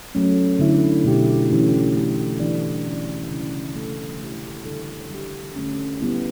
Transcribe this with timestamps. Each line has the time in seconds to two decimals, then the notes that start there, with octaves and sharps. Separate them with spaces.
0.15 F#3 A3 C#4
0.59 D3 A3 E4
1.04 B2 A3 E4 G4
1.50 E3 A3 C#4 G4
1.95 A3 C#4 G4
2.40 E3 G3 D4
2.85 A3 C#4 E4
3.31 C#3 G3 C#4 E4
3.75 E3 A3 D4 A4
4.20 A3 E4 G4
4.65 D3 G3 D4 A4
5.10 G3 D4 G4
5.56 D3 A3 C#4
6.01 G3 B3 E4